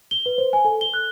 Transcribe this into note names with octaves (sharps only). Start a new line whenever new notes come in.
G7
B4
C5
G#5
A4
G7
F#6